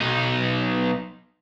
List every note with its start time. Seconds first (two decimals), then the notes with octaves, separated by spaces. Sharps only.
0.01 B1 D#4